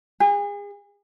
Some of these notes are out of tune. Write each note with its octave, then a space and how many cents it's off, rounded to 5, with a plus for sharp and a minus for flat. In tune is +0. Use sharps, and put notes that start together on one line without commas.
G#4 -35